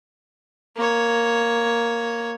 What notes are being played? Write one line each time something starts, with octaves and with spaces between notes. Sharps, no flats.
A#3 C#5